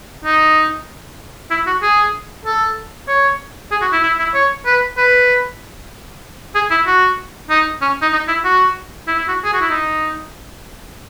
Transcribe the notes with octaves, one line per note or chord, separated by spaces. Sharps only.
D#4
E4
F#4
G#4
A4
C#5
G#4
F#4
E4
E4
E4
C#5
B4
B4
G#4
E4
F#4
D#4
C#4
D#4
D#4
E4
F#4
E4
E4
F#4
G#4
F#4
E4
D#4